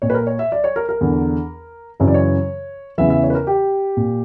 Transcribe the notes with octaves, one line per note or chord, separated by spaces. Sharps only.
A#2 C#5
B4
A#4
C#5
E5
D5
C#5
A#4
A#4
E2 D3
F#2 C#3 E3 C#5
D5
C#5
E2 C#3 E3 E5
E5
C#5
B4
A#4
G4
A#2